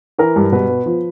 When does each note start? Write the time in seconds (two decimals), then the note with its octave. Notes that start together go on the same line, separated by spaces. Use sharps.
0.19 E3 A#4
0.36 G2
0.52 B2 B4
0.69 B3
0.86 F3